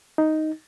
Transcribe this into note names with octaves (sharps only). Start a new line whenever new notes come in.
D#4